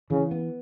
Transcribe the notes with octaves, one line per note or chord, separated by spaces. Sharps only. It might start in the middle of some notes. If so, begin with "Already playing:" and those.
C#3 E3
B3